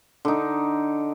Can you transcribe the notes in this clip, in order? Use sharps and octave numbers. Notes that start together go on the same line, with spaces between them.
D3 D#4